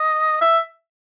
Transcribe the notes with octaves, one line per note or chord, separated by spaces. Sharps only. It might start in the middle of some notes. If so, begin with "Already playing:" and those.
Already playing: D#5
E5